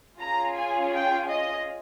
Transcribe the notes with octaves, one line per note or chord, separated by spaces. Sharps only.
C#4 F4 G#4 A#5
G#5
G5
D#5